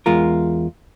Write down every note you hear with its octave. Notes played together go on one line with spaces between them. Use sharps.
E2 G#3 F4 A#4